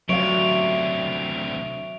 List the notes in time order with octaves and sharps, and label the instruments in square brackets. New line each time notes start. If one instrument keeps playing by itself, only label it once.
[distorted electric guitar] D2 C3 [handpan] F#3 F5 [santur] C#5 E5 [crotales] D7 F7